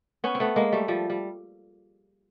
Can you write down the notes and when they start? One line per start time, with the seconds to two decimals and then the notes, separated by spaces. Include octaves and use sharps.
0.24 B3 C#4
0.35 C4
0.40 A3 B3
0.56 G#3 A#3
0.72 G3 A3
0.88 F3 G3
1.10 G3